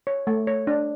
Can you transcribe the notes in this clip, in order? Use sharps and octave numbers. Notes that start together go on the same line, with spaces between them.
C#5
A3
C#5
D4